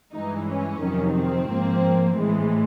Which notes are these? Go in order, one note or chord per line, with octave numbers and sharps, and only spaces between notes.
G2 E3 G#3 D#4
C#4
F2 C3 D#3 F#3
C4
G#2 F3 A#3
A2 E3 G#3